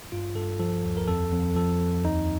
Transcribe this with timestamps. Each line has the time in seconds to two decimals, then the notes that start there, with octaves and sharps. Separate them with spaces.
0.12 G2 F4
0.36 G2 A4
0.60 F3 A4
0.84 D#2
0.97 A#4
1.08 F2 A4
1.32 F2
1.56 F3 A4
1.80 F2
2.03 D#2 D#4